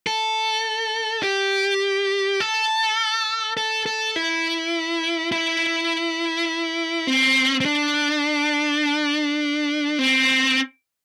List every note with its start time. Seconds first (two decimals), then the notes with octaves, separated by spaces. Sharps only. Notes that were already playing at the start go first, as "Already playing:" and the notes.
0.07 A4
1.23 G4
2.40 A4
3.57 A4
3.86 A4
4.16 E4
5.32 E4
7.07 C4
7.60 C4
7.65 D4
9.99 C4